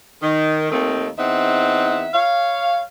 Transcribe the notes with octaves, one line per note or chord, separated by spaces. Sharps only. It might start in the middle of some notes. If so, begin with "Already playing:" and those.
D#3
D#2 D#3 A3 C4 D#4
E2 C4 D#4 E5 F#5
C#5 F5